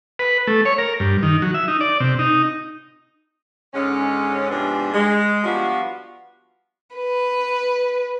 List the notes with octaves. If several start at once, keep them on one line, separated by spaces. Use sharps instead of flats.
B4
A3
C#5
A#4
G2
D#3
F#3
E5
D#4
D5
C3
D#4
G#2 D3 G#3 C#4
G#2 C3 F3 B3 C4 D4
G#3
F3 G3 B3 D4 F4 F#4
B4